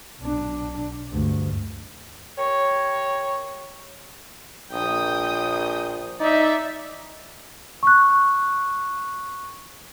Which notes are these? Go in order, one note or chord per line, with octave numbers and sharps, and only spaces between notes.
B1 D4
D2 G2
G4 A#4 C#5
A#1 G5 D#6
D#4 D5 E5
C#6 F#6